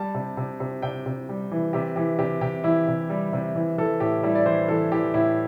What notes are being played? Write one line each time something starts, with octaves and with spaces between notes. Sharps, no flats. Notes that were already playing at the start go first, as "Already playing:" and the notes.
Already playing: G3 A5
C3
C3
C3
C3 G5
C3
G3
E3
C3 G4
E3 G4
C3 G4
C3 G4
E3 E4
C3
G3
C3
E3
E3 A4
A2 G4
G3 E4
D5
E3 C5
E3 A4
E3 G4
A2 E4